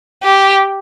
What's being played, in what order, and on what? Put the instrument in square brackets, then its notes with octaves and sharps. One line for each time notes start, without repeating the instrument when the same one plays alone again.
[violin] G4